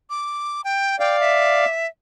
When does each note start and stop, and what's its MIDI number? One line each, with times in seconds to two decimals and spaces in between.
0.10 0.61 86
0.64 0.98 79
1.00 1.65 74
1.00 1.65 77
1.00 1.19 79
1.20 1.87 76